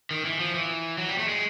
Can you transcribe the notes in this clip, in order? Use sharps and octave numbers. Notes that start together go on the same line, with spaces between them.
D#3
E3
F3
E3
F#3
G3
A3
G#3